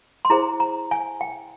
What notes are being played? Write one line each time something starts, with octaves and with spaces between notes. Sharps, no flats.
C6
E4 G#4 C5 A#5
A#5
G#5
G5